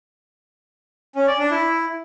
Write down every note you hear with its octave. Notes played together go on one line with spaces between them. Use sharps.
C#4
D5
D4
E4